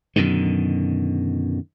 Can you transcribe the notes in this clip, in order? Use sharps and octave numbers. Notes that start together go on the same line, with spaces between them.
F#2 B2 D3 D#3